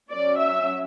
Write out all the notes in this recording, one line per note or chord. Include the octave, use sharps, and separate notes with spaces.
F#3 C#4 D5
E5